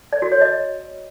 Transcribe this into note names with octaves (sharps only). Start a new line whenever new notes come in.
D5
F#4
C#5
D#5